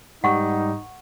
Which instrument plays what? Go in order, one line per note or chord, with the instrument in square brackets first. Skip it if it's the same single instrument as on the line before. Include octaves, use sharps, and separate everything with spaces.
[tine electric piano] G#2 G3 G4 [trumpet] D#4 [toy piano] F#5 C#6